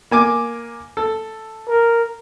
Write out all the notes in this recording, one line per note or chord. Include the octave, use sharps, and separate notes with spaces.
A#3 G#5 D6
A4
A#4